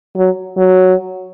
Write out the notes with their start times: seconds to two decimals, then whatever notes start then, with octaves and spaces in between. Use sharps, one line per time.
0.16 F#3
0.57 F#3